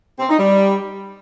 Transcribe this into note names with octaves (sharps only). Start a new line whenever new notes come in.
C4
D#4
G3